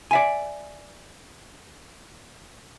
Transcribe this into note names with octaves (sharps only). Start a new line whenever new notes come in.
D5 E5 G#5